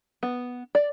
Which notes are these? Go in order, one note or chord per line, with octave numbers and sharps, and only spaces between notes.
B3
D5